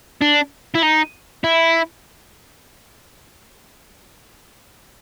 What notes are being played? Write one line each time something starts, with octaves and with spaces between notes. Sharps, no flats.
D4
E4
D#4
E4